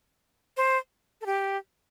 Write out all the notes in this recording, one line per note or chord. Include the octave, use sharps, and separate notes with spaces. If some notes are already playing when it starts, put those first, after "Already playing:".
C5
A4
G4